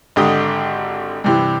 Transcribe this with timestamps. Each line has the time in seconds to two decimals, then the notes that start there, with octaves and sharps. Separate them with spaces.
0.16 G#1 D3 G4 D#6
1.24 G2 C3 E3